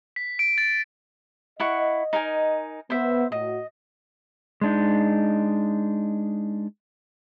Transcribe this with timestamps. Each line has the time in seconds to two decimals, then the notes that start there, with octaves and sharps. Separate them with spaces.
0.16 B6
0.39 D7
0.58 A6
1.60 E4 D#5 F#5 C#6
2.13 D#4 A#4 G#5
2.90 B3 C5 E5
3.32 A2 F#4 D#5
4.61 G#3 D4 D#4